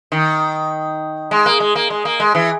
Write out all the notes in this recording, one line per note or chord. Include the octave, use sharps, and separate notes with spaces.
D#3
G#3
A#3
G#3
A#3
G#3
A#3
G#3
E3